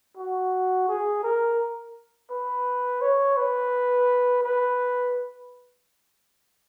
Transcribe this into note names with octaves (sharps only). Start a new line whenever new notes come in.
F#4
G#4
A#4
B4
C#5
B4
B4